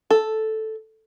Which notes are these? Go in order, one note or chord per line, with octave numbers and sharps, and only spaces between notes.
A4